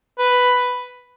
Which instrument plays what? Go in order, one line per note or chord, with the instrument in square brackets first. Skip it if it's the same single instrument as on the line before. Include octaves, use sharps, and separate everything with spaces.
[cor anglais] B4